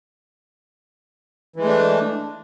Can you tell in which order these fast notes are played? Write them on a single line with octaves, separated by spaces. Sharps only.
E3 G#3 A3 D4